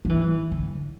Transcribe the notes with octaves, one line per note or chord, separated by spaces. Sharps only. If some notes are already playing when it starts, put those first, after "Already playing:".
F#3
E3
D3